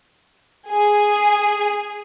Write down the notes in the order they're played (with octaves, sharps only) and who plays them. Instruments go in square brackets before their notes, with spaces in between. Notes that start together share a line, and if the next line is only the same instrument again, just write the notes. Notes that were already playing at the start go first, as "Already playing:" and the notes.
[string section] G#4